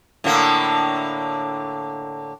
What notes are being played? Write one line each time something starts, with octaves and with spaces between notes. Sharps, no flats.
A2 D3 A#3